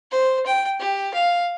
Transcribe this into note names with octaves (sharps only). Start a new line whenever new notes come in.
C5
G5
G4
F5